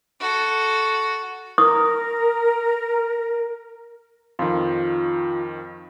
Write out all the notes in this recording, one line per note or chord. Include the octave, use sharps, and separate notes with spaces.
F#4 A4
A#4 D#6
F2 D#3 F4